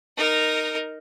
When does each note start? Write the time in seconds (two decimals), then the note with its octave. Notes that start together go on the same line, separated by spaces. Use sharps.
0.17 D#4 A#4